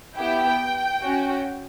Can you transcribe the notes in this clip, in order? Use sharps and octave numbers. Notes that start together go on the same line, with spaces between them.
B3 E4 G4 G5
C#4 F#4